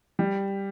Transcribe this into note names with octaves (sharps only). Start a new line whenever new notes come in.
G3